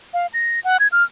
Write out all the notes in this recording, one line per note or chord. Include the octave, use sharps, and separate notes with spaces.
F5
A#6
F#5
G#6
F6